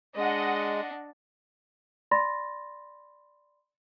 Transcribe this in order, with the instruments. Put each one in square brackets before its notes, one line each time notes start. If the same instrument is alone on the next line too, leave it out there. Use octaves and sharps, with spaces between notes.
[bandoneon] G#3 [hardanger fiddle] D4 [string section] D#5 F#5
[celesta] D5 B5 C6 A6 A#6